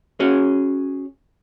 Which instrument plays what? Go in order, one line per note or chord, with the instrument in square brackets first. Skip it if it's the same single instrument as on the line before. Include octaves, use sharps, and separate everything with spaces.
[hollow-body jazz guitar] C#4 F#4 G#4 C#5